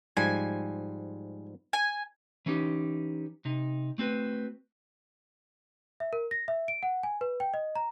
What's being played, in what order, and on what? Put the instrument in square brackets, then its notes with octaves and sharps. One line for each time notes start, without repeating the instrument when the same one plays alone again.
[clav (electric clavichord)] G#2 F3 G3 [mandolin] G#5
[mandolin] G#5
[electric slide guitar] E3 C#4 D#4 G4
C3 D#4
A3 C4 F#4 B4
[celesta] E5
A#4
A#6
E5
D7
F#5
G#5
B4
G5
D#5
A#5